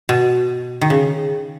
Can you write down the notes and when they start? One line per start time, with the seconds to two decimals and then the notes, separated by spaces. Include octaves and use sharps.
0.09 B2
0.81 D#3
0.90 C#3